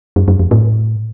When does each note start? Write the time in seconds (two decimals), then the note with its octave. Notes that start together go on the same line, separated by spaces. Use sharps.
0.16 F#2
0.28 F#2
0.40 F2
0.51 A2